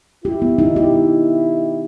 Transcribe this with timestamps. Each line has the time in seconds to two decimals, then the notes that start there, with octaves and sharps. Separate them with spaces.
0.24 E4 G4
0.42 B3
0.58 D#4
0.76 G4